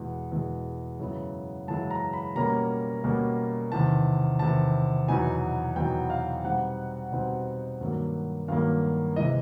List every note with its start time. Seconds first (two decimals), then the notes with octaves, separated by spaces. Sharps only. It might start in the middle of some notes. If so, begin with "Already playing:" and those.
Already playing: E2 B2 G#3
0.31 E2 B2 G#3
0.99 F#2 C#3 E3 G#3 B3
1.68 F#2 C#3 E3 G#3 B3 A5
1.91 A#5
2.13 B5
2.35 B2 G3 A#3 C#4 A#5
3.04 B2 G3 A#3 C#4
3.72 E2 C3 D#3 A5
4.39 E2 C3 D#3 A5
5.08 E2 B2 F#3 B3 D#4 G#5
5.76 E2 B2 F#3 B3 D#4 G5
6.10 F5
6.44 B2 G3 C4 D#4 F#5
7.12 B2 G3 C4 D#4
7.81 G2 D#3 F#3 A#3
8.48 G2 D#3 F#3 A#3 F5
9.16 C3 E3 G#3 D#5